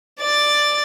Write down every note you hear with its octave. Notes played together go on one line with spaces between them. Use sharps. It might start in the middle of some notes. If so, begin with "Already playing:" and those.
D5 A6